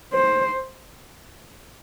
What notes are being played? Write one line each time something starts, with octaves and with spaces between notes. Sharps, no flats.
C5